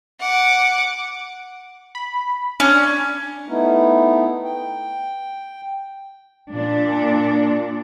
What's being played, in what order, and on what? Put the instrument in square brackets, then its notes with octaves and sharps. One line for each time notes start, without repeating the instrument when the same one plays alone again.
[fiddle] F#5 D6
[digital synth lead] B5
[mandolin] C#4 [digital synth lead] D4
[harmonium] A3 B3 D#4 E4
G5
[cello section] A#2 D4